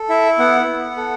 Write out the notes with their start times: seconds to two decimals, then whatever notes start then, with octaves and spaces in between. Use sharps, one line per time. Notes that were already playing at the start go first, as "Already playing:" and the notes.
Already playing: A4
0.09 E4 E5
0.39 B3 F#5
0.67 B3
0.97 A4